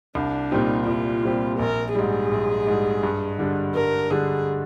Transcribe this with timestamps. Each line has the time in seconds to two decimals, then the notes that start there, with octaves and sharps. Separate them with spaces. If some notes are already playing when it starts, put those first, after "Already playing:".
0.15 C2 D4
0.51 A#2 G3 C4 D#4 G4
0.87 C2 F4
1.23 A#2 G3 C4 G4
1.59 A#1 A#4
1.95 G#2 G3 G#4
2.31 A#1
2.67 G#2 G3
3.03 G2
3.39 D3 G3 D4
3.75 G2 A#4
4.11 D3 G3 D4 G#4